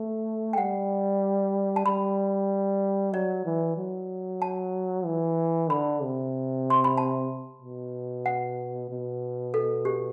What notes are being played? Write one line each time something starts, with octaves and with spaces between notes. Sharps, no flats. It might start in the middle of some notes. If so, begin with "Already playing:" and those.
Already playing: A3
G5
G3 F#5
A5
G3 B5
F#3 D5
E3
F#3
A5
E3
D3 B5
C3
C6
B5
A5
B2
F#5
B2
A4
G4